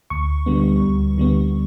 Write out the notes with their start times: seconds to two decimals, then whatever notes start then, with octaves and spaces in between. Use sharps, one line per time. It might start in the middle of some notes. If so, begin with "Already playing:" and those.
0.10 D2 C#6
0.46 D3 G3 B3
0.82 D2
1.18 D3 G3 B3